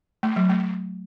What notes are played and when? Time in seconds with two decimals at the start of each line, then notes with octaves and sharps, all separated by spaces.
0.23 A3
0.36 F#3
0.50 A3